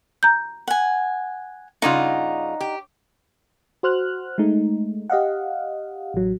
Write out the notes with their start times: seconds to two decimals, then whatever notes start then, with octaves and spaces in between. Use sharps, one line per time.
0.23 A#5 G6
0.68 F#5 G#5
1.82 G2 C#3 D#4 F4 D5 F#5
2.61 G4
3.83 F#4 C5 F6 F#6
4.38 G#3 A3 D#4
5.10 G4 D#5 F5 F#5
6.14 A1 F#3